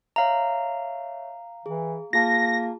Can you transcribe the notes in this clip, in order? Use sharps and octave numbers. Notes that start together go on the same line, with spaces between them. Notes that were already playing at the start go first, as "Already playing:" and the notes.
C#5 E5 F5 A#5
E3 G#4
A#3 F4 G#4 A5 A#6